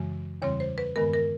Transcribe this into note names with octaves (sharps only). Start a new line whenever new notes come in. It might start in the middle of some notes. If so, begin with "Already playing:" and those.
Already playing: F#2 C#3 E3 G#3
E2 C#3 E3 G3 C4 C#5
C5
B4
G2 D#3 G#3 B3 A#4
A#4